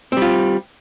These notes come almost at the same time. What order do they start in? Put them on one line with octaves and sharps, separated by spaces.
C4 G3 F4